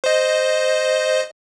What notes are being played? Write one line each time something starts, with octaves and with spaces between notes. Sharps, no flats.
C5 D#5